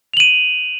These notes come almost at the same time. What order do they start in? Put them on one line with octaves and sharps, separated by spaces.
F7 F#7 D#7